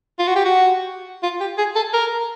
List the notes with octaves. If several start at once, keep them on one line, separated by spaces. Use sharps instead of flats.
F4
F#4
G4
F#4
F4
G4
G#4
A4
A#4